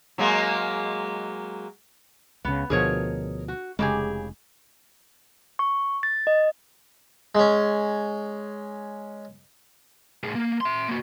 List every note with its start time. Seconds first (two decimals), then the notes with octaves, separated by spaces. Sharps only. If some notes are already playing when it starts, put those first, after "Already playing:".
0.18 F#3 G#3 A#3
2.44 C#2 C#3 B3
2.70 D2 B2 F3 G#4 A#4 C#5
3.48 F#4
3.79 F1 C#3 G#3 G4 G#4
5.59 C#6
6.03 A6
6.27 D#5
7.35 G#3 C#4
10.24 A2 G#4
10.35 A#3
10.61 E5 C6
10.88 A#3 F#4